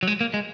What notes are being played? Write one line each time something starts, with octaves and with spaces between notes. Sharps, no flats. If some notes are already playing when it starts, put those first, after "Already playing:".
F#3
G#3
A#3
G#3